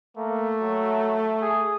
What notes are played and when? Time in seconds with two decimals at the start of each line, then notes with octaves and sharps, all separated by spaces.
0.17 A3 A#3
0.62 F#3
1.42 G#4